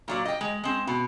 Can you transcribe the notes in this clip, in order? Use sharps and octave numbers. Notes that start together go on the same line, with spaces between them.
A#2 F#3 D5
D#5 G5
G#3
G#3 C4
B2